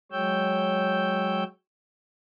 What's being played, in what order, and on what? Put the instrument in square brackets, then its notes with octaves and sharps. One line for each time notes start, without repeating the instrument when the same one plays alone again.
[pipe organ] F#3 G#3 C#5 G5 E6 G6